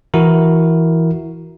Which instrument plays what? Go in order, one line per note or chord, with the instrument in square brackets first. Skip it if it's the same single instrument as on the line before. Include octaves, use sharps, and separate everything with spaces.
[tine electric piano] E3 E4 F#4 A#4